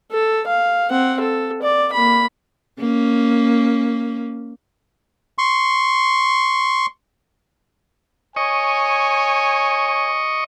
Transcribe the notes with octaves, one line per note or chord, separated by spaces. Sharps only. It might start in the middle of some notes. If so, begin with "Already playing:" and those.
A4
F5
C4 F#5
A4
D5
A#3 B5
A#3 C#4
C6 C#6
C#5 D#5 G#5 C#6